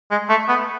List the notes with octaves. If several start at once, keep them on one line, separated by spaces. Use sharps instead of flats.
G#3
A3
B3